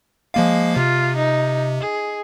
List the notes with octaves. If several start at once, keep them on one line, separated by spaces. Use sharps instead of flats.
F3 G#3 A#3 F5
C3 F4
D#4
G#4